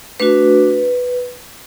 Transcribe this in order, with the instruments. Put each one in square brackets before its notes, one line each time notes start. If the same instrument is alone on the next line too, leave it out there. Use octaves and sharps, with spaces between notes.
[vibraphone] A3 D4 F#4 B4